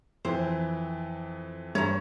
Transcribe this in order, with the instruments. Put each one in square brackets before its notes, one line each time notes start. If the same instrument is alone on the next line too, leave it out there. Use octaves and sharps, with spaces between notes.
[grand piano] F2 E3 [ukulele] C5
[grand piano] G2 [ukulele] C#5 A#5